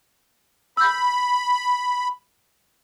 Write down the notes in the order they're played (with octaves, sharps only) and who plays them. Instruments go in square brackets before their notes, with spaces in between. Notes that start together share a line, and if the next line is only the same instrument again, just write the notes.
[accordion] B5 [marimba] E6 G6